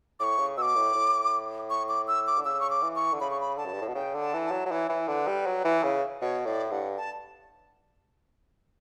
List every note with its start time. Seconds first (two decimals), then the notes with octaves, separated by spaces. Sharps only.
0.20 A2 C#6 D6
0.39 C#3
0.57 B2 D6 E6
0.76 A2
0.95 A2
1.70 C#6
1.89 D6
2.08 E6
2.27 D6
2.38 D3
2.45 C#3 E6
2.60 C#6
2.70 D6
2.82 E3
2.96 C#6
3.13 D3
3.21 C#3 B5
3.31 C#6
3.41 B5
3.57 D3 A5
3.66 F#2
3.73 G2
3.81 A2
3.88 B2
3.95 C#3 G5
4.15 D3
4.20 A5
4.34 E3
4.46 A5
4.51 F#3
4.66 F#3
4.71 E3 C#5 D5
4.89 E3
5.08 D3 B4
5.28 G3
5.46 F#3
5.65 E3
5.83 C#3
6.21 B2 C#5
6.46 A2 D5
6.71 G2 F#5
6.97 A5